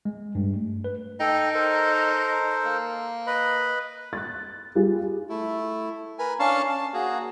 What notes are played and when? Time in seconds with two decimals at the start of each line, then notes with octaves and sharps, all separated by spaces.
0.05 G#3
0.35 G2
0.56 A3
0.84 B4
1.20 D#4 A4 G5
1.54 A4 A#4 C5
2.65 A#3
3.27 B4 D#5 B5
4.13 F#6 A6
4.75 G3 F4 G#4
5.29 A3 E4
6.19 A#4 B4 G#5
6.39 C#4 D4 F5 A5 C#6
6.69 A5
6.94 A#3 F#4 G#4